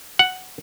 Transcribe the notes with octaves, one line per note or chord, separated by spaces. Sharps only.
F#5